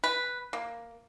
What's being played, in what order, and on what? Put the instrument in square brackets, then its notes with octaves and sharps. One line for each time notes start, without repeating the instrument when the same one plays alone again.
[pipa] B4
A#3